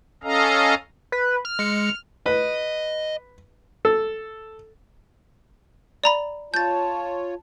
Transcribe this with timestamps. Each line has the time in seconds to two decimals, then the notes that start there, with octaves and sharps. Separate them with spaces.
0.23 C#4 A4 D#5 F5 A#5
1.12 B4
1.45 F6
1.59 G#3 C#7
2.26 B4 D#5
3.85 A4
6.04 D5 A#5 B5
6.54 F4 C#5 A5 G6 A6